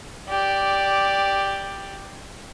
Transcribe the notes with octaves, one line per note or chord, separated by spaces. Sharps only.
G4 D5